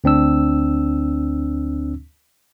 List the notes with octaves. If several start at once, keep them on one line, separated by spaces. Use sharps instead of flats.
D2 C4 D4 E6